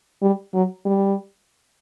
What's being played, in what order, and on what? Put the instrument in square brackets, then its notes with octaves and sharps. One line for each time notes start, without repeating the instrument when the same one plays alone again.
[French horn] G3
F#3
G3